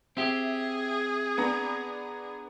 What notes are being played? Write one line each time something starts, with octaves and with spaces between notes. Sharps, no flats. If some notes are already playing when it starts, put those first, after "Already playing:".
C4 G4 G#4 E5
B3 D4 A#5